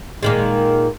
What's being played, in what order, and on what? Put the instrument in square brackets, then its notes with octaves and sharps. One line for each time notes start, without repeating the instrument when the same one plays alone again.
[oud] A#2 D#3 G#3